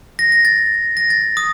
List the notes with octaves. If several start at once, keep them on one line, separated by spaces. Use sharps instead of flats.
A#6
A#6
A6
A#6
A6
D#6